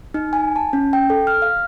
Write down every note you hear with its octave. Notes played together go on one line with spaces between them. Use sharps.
D#4
G#5
A5
C#4
G5
A4
F6
F5